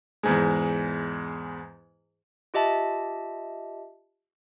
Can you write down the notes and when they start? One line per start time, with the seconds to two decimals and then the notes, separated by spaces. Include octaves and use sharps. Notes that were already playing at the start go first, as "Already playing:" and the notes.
0.23 E2 G#2 G#3
2.54 F4 G4 D#5 E5 A5